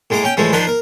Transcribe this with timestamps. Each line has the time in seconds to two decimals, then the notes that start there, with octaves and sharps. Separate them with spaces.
0.10 A2 G#3 A#5 D6
0.23 C#4 G5
0.37 A2 E3 F3 G#3 A3
0.53 D#3 F3 D4 B4 C5
0.67 A#4